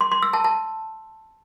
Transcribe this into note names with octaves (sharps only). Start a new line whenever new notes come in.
C6
C6
E6
A5
A5